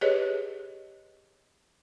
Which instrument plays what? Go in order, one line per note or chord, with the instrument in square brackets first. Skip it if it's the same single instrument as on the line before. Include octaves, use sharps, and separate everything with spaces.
[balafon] G4 G#4 B4 C#5 D#5